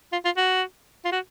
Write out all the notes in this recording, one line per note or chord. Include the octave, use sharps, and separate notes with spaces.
F4
F4
F#4
F4
F#4